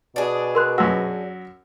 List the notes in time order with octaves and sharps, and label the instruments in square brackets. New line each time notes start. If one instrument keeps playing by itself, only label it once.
[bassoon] B2 [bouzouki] D4 G#4
[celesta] A#4 C6 F#6
[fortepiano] F#2 F#4 [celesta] F#5 E6